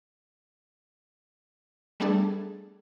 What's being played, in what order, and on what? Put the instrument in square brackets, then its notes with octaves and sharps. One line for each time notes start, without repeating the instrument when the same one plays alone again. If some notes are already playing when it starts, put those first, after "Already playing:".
[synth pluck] G3 A3 B3 D4 G#4 A4